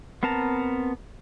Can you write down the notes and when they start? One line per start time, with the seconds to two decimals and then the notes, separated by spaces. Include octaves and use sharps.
0.23 B3 C4 A#4 A5 A#5